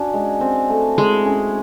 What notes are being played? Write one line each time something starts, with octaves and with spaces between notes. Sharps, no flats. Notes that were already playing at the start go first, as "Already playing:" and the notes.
Already playing: C#4 D4 F#4
G#3
C4
A3
G#3 E4
C#4